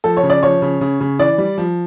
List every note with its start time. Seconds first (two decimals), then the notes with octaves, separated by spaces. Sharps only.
0.04 F3 A4
0.17 C#5
0.23 C#3
0.30 D5
0.43 F3 C#5
0.62 C#3
0.81 C#3
1.01 C#3
1.19 E3 D5
1.38 G3
1.58 F3